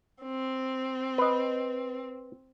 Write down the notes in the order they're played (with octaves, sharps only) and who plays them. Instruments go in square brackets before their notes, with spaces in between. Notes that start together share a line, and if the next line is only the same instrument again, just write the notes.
[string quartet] C4
[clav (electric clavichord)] B4 D#5